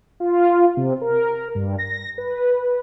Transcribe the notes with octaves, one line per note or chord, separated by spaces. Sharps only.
F4
C3
A#4
G2
A#6
B4